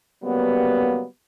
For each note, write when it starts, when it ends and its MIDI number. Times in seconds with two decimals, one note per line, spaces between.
0.23 1.03 49
0.23 1.03 54
0.23 1.03 55
0.23 1.03 58
0.23 1.03 59